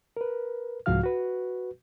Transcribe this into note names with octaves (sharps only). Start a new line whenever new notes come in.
A#4 B4
C2 G#2 F3 F#4 F5 F6
F#4 B4